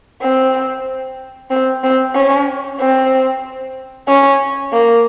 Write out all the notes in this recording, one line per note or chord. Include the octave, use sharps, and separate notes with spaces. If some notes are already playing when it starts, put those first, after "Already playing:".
C4
C4
C4
C#4
C4
C#4
A#3